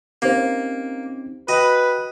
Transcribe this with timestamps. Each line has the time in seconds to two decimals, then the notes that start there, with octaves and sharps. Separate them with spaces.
0.22 A#3 C4 C#4 D#4 G4 C5
1.48 F#4 B4 D#5 G5